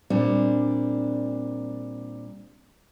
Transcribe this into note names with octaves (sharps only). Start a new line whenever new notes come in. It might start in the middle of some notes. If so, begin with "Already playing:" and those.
A#2 G3 C4 D4